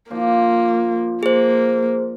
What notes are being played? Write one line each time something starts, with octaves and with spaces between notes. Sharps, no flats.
F3 A#3 D4 F4
A#3 G#4 C5